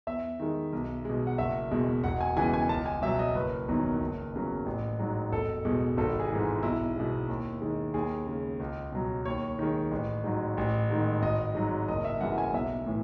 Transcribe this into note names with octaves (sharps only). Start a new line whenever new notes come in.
E2 E5
D#3 G#3
B1
B2 G#3
F#5
F#1 E5
E2 B2 G#3
E1 F#5
G#5
E2 C#3 E3 G#3 G#5
G#5
C#2 A5
G#5
B2 F#3 E5
D#5
F#1 B4
E2 D#3 F#3
F#1
E2 C#3 F#3
A1
G#2 F#3
E1 A4
E2 B2 G#3
G#1 A4
G#4
G#2 E3 G#3
B1 E4
B2 G#3
D#2
D#3 G#3
D#2 G#4
C#3 G#3
C#2
B2 F#3
D#2 C#5
D#3 G#3
A1
G#2 F#3
A1
G#2 D#3 G#3
G#1 D#5
G#2 F#3
F#1 D#5
E5
F#2 E3 G#3 F#5
G#5
B1 E5
A2 E3